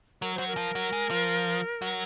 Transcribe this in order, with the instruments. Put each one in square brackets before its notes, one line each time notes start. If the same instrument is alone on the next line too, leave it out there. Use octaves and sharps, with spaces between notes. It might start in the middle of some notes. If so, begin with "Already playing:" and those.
[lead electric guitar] F#3 [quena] A#4
[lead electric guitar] F#3 [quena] C5
[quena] A#4
[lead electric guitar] F3
F#3
G#3
F3
F#3